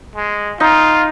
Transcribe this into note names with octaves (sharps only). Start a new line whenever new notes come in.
G#3
D#4 F4